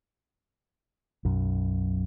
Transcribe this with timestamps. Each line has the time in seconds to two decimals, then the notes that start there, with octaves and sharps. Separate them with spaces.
1.25 B1 F#2